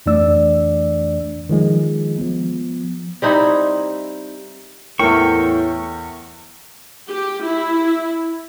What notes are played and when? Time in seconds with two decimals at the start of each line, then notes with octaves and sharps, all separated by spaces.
0.06 F2 E3 A3 D4 D5 E6
1.49 D#3 F3 G#3
2.18 F3 B3
3.22 G3 C4 D#4 E4
4.99 E2 A2 A#4 G5 C#6
7.09 G4
7.43 E4